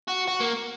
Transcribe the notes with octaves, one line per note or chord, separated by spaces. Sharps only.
F#4
F#4
A#3